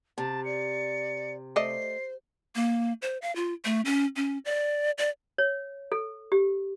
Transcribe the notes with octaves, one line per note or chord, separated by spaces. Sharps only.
C3 A5
D5 C#7
A3 C5 D5 D#5 C7
A#3
C5
F5
F4
A3
C#4
C#4
D5
D5
C#5
A4
G4